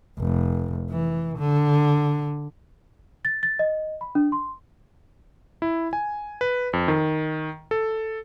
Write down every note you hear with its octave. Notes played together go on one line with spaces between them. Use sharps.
F1
E3
D3
A6
A6
D#5
B5
D4
C6
E4
G#5
B4
F2
D#3
A4